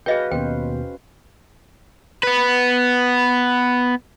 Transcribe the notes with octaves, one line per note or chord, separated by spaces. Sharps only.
F#4 G#4 B4 D#5 F5 G5 G6 A#6
D#2 B2 C#4 C5 G5
B3 B4